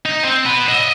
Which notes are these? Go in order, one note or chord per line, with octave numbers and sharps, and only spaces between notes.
D#4
C4
F#4 B4
D#5 E5